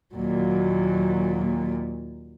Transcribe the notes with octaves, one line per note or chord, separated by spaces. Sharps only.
D#2 A#2 F#3